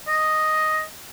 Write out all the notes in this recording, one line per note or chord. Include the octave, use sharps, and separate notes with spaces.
D#5